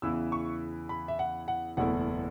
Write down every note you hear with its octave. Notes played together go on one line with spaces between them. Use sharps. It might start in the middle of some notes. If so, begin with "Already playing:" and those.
E2 C#3 E3 B3 E4 E6
C#6
B5
E5
F#5
F#5
F#1 E2 B2 A3 E4 F#5